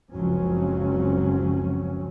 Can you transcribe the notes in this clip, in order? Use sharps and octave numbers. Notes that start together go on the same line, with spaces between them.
F#1 C#2 F3 F#3 C4 C#4